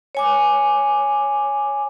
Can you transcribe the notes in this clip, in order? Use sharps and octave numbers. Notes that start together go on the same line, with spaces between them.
C#5 G#5 D6